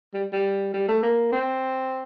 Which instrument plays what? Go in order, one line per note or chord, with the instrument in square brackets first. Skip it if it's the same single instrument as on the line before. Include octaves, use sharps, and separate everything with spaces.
[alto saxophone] G3
G3
G3
A3
A#3
C4